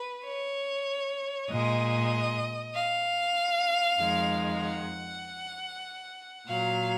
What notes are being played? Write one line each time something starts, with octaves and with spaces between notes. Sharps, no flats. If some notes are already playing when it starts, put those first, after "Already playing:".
Already playing: B4
C#5
A#2 G#3 D#5
F5
F2 D#3 G#3
F#5
A#2 F#3 F5